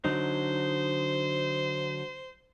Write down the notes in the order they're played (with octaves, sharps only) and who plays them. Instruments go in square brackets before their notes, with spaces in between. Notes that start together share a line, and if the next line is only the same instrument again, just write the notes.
[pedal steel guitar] D3 F#3 D#4 [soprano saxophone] C5